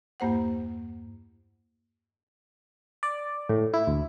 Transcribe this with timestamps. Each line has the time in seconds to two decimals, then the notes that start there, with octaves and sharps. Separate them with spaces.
0.20 E2 G2 A#3 C5 F#5
3.03 D5
3.49 A2
3.74 E4
3.87 D2